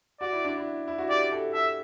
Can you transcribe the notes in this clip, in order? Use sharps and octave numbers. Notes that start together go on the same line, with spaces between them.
F#4 D5
E4
D4
E4
E4
F#4
G4 D5
A4
A4 E5